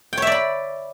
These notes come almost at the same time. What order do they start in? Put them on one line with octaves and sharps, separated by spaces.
G5 C#5 E5 D5 B5